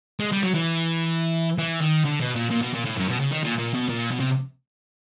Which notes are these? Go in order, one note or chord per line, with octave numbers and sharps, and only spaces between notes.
G#3
G3
F#3
E3
E3
D#3
D3
B2
A#2
A#2
B2
A#2
A2
F#2
B2
C#3
D#3
A#2
A#2
B2
A#2
B2
C3